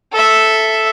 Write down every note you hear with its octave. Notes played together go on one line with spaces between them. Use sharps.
A4 E5